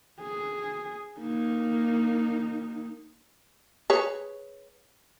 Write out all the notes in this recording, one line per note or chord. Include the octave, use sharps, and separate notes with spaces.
G#4
A#3 D#4
G#4 B4 C#5